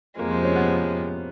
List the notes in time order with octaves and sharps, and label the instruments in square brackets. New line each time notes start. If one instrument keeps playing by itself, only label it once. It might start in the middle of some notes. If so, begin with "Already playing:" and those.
[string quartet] F2 C3 F3 G#3 [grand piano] A#3
[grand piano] C4
C#4
B3